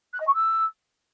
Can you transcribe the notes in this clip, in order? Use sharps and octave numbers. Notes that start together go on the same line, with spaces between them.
F#6
D#5
C#6
E6